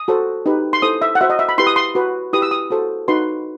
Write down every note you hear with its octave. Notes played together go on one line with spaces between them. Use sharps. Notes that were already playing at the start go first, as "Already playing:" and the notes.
Already playing: D#6
F#4 A4 C5
D#4 G4 B4
C6
E4 A4 C5 D#6
E5
F#5
F#4 C5 E5
D#5
E5
B5
E4 G4 B4 C6
D#6
C6
F#4 B4
E4 G4 B4 D#6
E6
D#6
F#4 A4 C5
D#4 F#4 B4 C6